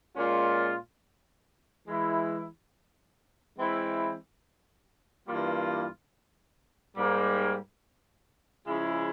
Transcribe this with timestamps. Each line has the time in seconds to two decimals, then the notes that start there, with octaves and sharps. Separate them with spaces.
0.15 A#2 G#3 C#4 F4
1.86 E3 G#3 E4
3.56 E3 G#3 C4 E4
5.27 G2 E3 G3 A#3 F4
6.96 G#2 G3 A#3
8.67 C#3 F3 G#3 E4